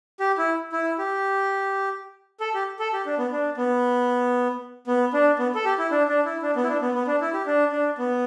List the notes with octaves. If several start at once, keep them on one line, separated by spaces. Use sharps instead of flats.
G4
E4
E4
G4
A4
G4
A4
G4
D4
B3
D4
B3
B3
D4
B3
A4
G4
E4
D4
D4
E4
D4
B3
E4
D4
B3
B3
D4
E4
G4
D4
D4
B3